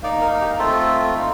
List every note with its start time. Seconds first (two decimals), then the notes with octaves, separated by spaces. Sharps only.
0.03 A#3 D#4 D5
0.22 A#4
0.41 G4
0.59 A3 C4 F4 A4
1.15 A#3 D#4